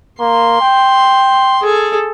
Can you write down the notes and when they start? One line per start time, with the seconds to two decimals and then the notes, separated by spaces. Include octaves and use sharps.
0.20 A#3 C6
0.61 G5
1.62 G#4 A4